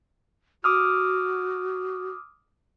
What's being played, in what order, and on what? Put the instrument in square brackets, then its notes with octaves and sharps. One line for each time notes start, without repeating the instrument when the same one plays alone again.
[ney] F#4 [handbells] D6 D#6 F6